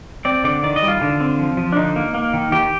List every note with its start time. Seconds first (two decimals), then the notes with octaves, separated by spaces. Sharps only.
0.25 C4 D5
0.44 D3 D5
0.63 D#3 D5
0.76 D#5
0.83 G3
0.88 F4
1.02 D3
1.21 C4
1.39 F3
1.57 F3
1.72 D4
1.77 D3 D#4
1.96 A#3
2.15 A#3
2.34 D#3
2.52 D#3 G4